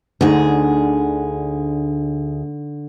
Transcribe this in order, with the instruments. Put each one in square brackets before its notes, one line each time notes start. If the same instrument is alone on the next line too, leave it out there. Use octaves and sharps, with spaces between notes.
[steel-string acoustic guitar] D2 G#4 [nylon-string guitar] D3 D#4